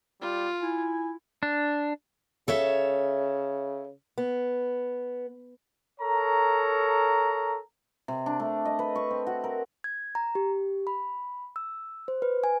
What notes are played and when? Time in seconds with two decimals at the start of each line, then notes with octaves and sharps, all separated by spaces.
0.21 G3 F4
0.62 E4 G#5
1.43 D4
2.48 C#3 A4 C#5 E5
4.18 B3
6.00 A4 A#4 C#5 A#5
8.08 C3
8.26 D4
8.40 A3
8.65 D#5
8.79 B4
8.96 C#6
9.11 C4
9.27 F#4
9.44 A#4
9.84 G#6
10.15 A#5
10.35 G4
10.87 B5
11.56 E6
12.08 C5
12.22 B4
12.44 G#5